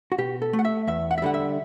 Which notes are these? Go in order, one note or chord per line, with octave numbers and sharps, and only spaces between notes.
F#4
B2 G4
A4
A3
F#5
E5
E2 E5
F#5
E5
D3 G3 F#5
E5